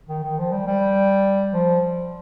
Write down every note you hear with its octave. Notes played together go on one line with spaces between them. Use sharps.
D#3
D#3
F3
G3
G3
F3